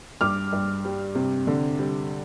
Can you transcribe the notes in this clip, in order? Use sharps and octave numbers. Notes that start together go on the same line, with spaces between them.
G2 D6 F6
G2
G3
C3
D3
G3